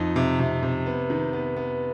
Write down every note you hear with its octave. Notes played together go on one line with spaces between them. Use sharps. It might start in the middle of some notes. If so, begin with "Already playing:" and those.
Already playing: F2 D#4
C3
C3
C3
B3
D#3
B3
B3